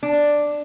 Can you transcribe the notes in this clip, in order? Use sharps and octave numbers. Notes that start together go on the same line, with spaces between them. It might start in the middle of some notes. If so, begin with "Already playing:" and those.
D4